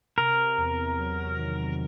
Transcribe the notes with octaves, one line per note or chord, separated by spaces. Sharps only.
C3 A#4
E2
F#3
D#3